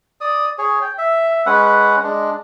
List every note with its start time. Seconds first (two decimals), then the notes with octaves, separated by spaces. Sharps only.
0.21 D5 D#6
0.58 G#4 C#5
0.81 G5
0.98 E5
1.46 G#3 C#4 B4 F#5
2.03 G#3 D4